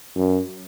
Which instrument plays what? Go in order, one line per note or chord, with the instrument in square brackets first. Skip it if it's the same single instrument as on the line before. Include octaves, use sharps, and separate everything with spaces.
[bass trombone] F#2